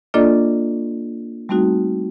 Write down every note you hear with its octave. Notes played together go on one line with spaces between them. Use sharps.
A#3 D4 F4 A4 D5 D#5
G3 A3 C4 D#4 F#4